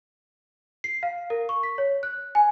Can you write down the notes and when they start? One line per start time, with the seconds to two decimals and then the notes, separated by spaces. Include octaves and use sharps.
0.84 C7
1.03 F5
1.30 A#4
1.49 C#6
1.63 B6
1.78 C#5
2.03 F#6
2.35 G#5